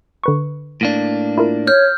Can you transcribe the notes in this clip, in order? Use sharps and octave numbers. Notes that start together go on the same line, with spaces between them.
D3 B4 C#6
A2 A#3 D4
E4 F4 A#4
C#5 F6 G6